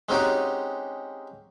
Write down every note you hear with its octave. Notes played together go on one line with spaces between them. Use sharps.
G#3 C4 C#4 D#4 F#4 G4